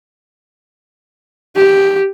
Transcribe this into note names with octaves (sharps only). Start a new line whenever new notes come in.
G4